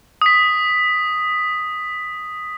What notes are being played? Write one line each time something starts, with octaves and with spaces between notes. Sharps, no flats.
D#6 B6